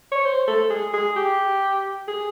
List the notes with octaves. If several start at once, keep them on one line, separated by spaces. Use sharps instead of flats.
C#5
C5
A4
G#4
G#4
G4
G#4